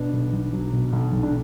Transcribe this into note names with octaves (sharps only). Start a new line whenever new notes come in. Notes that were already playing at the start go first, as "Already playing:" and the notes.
Already playing: B2 B3 D4
B1
B1
F#3
B2
B1
B1
D4